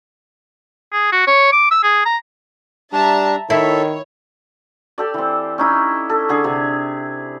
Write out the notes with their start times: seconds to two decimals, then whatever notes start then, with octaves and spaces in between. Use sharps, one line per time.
0.92 G#4
1.12 F#4
1.27 C#5
1.52 D6
1.71 E6
1.83 G#4
2.05 A#5
2.93 G3 D4 E5 A5 A#5
3.50 D#3 E4 A4 C#5
4.98 G4 A4 D5
5.14 E3 C4
5.58 C#4 D#4 E4
6.09 A4
6.29 D3 G#4
6.44 C3